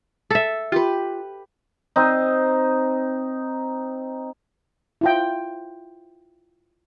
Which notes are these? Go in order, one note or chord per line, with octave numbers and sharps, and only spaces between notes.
A4 E5
F4 G4 B4
C4 D#4
E4 F4 G5